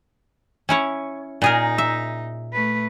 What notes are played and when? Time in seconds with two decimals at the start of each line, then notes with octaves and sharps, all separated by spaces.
0.69 C#4 E4 C#5
1.42 A#2 D#4 G#4 A#4
1.78 E5
2.52 A3 B4